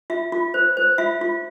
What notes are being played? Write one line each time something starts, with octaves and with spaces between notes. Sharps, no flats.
F4 E5
F4
C5
C5
F4 E5
F4